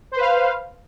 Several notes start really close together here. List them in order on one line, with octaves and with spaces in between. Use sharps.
C5 B4 F5